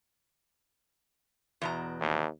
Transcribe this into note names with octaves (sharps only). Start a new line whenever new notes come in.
E2 B2 A#5
D#2